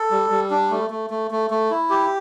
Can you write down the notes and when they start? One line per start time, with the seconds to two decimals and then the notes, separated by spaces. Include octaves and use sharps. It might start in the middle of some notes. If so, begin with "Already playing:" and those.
Already playing: A4
0.11 G3
0.30 G3
0.50 D4
0.70 A3
0.90 A3
1.10 A3
1.31 A3
1.50 A3
1.71 E4
1.90 G4